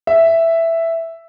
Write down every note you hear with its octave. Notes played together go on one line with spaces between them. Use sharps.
E5